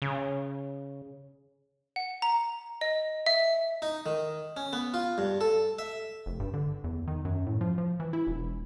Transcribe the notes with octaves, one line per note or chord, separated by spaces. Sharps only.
C#3
F#5
A#5
D#5
E5
D#4
D#3
C#4
B3
F4
G2
A4
E5
F1
G2
D3
E2
D#3
F#2
A2
F3
F3
E3
E4
E1